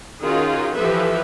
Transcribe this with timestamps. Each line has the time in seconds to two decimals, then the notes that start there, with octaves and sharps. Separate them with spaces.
0.22 D#3 C#4 D#4 F4 F#4 G#4
0.76 E3 F3 G4 A4 B4 E5